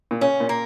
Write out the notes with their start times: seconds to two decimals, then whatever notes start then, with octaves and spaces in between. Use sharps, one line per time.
0.11 A#2
0.21 C#3 C#4
0.40 A#2
0.49 A#3